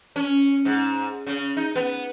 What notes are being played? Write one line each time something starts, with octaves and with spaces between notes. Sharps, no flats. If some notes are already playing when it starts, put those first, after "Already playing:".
C#4
G#2
C#3
D#4
B3